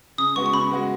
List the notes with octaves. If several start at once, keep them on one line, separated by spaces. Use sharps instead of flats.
C#3 D#6
G#3 B3 F#4 C#6
C#6
C#3 B5
G#3 B3 F#4